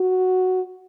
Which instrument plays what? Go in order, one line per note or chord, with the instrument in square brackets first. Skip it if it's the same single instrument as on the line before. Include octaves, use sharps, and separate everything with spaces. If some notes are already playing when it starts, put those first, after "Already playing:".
Already playing: [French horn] F#4